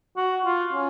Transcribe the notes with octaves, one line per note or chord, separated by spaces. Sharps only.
F#4
F4
C#4